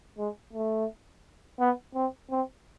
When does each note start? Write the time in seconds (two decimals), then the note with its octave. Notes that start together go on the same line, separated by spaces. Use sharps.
0.18 G#3
0.53 A3
1.60 B3
1.95 C4
2.31 C4